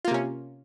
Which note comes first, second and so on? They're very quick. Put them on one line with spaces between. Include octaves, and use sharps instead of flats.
F4 A#3 C3 C#4